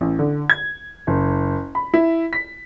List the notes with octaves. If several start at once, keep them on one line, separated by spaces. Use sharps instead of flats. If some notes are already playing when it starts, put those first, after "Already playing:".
A1
D3
G#6
F#1
B5
E4
B6